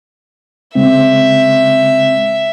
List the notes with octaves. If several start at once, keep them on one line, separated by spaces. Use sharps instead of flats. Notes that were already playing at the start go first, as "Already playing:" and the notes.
C#3 G#3 C4 E5